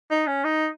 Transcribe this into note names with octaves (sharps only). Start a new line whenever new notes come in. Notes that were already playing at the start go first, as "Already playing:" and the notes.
D#4
C#4
D#4